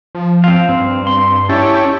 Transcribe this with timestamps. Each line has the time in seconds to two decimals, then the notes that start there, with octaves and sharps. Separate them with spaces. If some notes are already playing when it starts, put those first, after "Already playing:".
0.15 F3
0.44 C4 F5
0.69 G2 C4
1.07 C6
1.49 C#4 D4 E4 G4